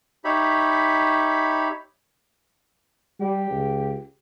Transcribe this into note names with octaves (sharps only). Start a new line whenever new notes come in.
D#4 G4 C#5 E5 B5
G3 G4
C#2